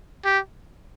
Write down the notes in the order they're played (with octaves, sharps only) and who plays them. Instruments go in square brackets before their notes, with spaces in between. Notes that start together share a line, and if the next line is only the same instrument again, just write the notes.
[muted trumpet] G4